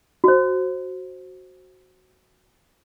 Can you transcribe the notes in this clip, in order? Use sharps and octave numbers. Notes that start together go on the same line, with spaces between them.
F#4 C5